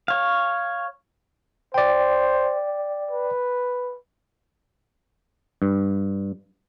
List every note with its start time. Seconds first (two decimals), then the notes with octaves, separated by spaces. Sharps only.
0.08 C#5 F5
1.74 C5 D5 G5
3.11 B4
5.62 G2